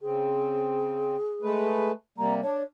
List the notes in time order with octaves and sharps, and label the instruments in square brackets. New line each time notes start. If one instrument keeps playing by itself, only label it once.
[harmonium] C#3 C4 [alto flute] G#4
[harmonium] G#3 A3 B4
[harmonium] C3 G3 A#3 [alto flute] A#5
[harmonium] D4 [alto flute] C#5